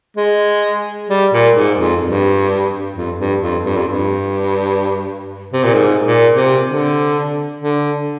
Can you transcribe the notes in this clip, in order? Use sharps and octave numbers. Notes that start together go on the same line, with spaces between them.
G#3
G3
A#2
G#2
F2
G2
F2
G2
F2
G2
F2
G2
C3
A#2
G#2
A#2
C3
D3
D3